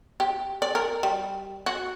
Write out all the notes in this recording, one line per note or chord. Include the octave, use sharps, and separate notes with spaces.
G4
D5
A#4
G3
F#4